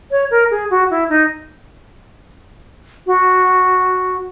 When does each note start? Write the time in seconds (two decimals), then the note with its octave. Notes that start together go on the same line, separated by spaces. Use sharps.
0.11 C#5
0.31 A#4
0.51 G#4
0.70 F#4
0.91 E4
1.09 D#4
3.07 F#4